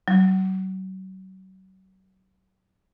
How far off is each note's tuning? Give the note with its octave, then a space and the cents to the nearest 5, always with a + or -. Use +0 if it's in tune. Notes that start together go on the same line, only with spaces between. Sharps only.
F#3 +35